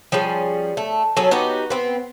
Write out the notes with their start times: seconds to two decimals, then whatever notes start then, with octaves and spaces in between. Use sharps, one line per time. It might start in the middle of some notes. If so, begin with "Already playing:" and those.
0.12 F3 G3 C#4 G#4
0.77 A3
1.17 F#3 C#4 G#4 A4
1.31 B3 D#4 F#4 G4
1.70 B3 C4